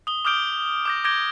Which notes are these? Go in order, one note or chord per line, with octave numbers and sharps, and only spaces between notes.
D#6 G7
D6 D#6 F6 G6 D7 G7
D6 G6 A#6
D6 G6 G#6 A#6 D7 G7